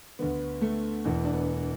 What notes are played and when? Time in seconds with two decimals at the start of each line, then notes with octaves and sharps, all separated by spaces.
0.19 D2 D3 B3
0.61 A3
1.05 E1 E2 E3
1.24 D4
1.33 B3